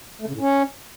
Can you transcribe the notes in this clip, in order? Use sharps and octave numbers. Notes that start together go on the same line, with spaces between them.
A3
C#3
A2
C#4